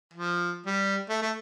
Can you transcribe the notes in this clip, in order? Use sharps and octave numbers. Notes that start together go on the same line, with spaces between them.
F3
G3
A3
A3